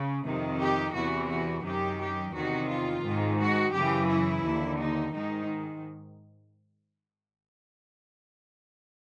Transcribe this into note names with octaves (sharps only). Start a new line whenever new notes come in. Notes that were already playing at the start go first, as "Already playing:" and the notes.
Already playing: C#3
F2 C3 D#3
G4
E2 C3 E3 F#4
F#4
F#2 D#3 G4
G4
E2 C3 D#3 F#4
F4
G#2 D#3
F#4
F#2 C#3 E3 G4
E4
D#2 D3
D#4
G#2 D#3 D#4